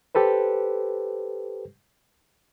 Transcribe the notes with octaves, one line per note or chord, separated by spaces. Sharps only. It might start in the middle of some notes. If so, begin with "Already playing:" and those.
G4 A4 B4 C5